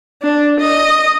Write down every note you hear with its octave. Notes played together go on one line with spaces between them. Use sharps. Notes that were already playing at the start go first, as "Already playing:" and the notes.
D4
D#5